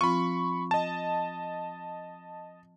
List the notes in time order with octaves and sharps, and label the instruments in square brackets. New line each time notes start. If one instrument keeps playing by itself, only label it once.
[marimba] F3 C4 F4 [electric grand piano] B5 C#6
[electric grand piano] D#5 A5